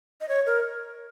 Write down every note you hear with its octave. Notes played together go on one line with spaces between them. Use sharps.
D#5
C#5
A#4